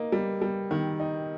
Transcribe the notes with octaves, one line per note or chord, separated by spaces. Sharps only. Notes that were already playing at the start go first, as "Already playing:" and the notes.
Already playing: A#3 D#4
G3
G3
D#3
D#4